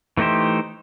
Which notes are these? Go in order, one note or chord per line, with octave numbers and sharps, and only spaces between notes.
E3 A3 D#4 G4 C5